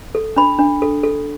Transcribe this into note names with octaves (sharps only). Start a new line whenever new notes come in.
A4
D4 B5
D4
A4
A4